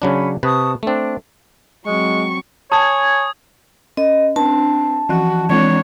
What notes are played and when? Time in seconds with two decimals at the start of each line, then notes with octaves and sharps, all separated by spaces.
0.02 C#3 F#3 C#4 D4 B5
0.43 C3 B4 A5 C#6 D#6
0.83 A3 C4 D4
1.86 F#3 G#3 C4 C#6
2.72 C#5 G#5 A5 D#6 G#6
3.97 C#4 D#5
4.36 C4 D4 A5
5.09 E3 F3 F#4 F#6
5.50 E3 G#3 C4 D4 C#5